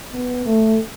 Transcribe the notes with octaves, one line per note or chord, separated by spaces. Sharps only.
B3
A3